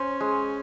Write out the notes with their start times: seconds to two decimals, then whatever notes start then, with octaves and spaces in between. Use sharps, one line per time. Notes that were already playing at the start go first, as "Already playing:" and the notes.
Already playing: C#4 C5
0.20 G#3